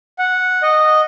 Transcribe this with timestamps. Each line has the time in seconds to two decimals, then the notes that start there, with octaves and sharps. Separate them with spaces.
0.19 F#5
0.63 D#5